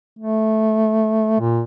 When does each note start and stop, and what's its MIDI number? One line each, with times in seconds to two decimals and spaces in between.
0.19 1.39 57
1.40 1.62 46